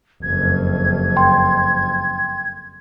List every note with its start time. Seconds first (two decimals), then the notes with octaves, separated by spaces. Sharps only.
0.23 F#1 F2 G#6
1.17 G5 C6